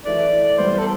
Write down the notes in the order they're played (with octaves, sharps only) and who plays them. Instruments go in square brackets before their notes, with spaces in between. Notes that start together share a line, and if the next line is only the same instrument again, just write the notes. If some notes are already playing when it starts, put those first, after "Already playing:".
[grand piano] E3 A3 E4 B4 [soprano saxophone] D5
[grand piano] E3 G3 B3 [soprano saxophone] C5
[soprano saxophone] A4